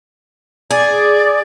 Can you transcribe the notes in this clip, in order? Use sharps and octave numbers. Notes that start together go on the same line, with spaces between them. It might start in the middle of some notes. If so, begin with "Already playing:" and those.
G#4 D5